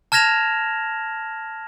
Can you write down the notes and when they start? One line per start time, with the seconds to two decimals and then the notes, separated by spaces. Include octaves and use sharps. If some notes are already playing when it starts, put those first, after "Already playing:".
0.12 A5 F6 G#6 A#6 E7 F7